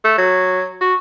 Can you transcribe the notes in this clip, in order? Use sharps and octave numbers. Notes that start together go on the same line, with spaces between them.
A3
F#3
F#4